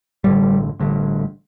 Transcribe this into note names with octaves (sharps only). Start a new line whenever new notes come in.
A1 G2 D3 G3
A1 G2 D3